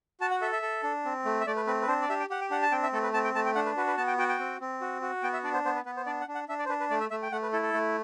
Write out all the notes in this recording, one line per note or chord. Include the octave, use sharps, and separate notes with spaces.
F#4 A5
F#5
A4 E5
E5
A4
D4
C4
A3
E5
A3 D5
B4
C4 B4
B4
D4 C5
D5
G4 E5
G5
G4 F#5
G5
D4 F#5
A5
C4 G5
E5
A3 A4
B4
C4 A5
G5
A3 A5
G5
D4 F#5
B4
F#4 B4
B4
B3 A5
G5
F#4 G5
G5
C4
C4
F#4
F#4
B3 G5
E5
D4 D5
C5
B3 C5
B4
B3 B4
C5
D4 D5
F#5
D4
F#5
D4 E5
D5
C5
D4 B4
B4
A3 D5
E5
A3 E5
G5
A3 F#5
B4
E4 A4
A4
A3